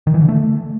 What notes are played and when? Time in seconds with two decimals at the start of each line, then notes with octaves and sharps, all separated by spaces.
0.07 D#3
0.14 E3
0.21 D3
0.29 A3